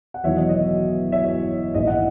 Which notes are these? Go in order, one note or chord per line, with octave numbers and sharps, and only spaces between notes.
F#5
E1 E2 D#3 F#3 C#5 E5
D#5
D#5
C#5 E5
C#5
A#1 G#2 E3 D#5
D#5 F#5